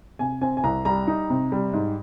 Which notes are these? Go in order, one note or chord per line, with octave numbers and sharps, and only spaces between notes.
C3 G#5
C4 G#5
G#5
C2 A#5
G3 A#5
D#4
C3
G3
G#2